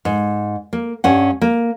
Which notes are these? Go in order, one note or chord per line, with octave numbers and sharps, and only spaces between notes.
G#2
A#3
G2 C#4 F#5
A#3